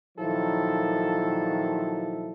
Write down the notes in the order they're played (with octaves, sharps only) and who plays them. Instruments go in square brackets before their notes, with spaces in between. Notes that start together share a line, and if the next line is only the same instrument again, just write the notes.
[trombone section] A#2 D#3 F3 F#3 E4 A4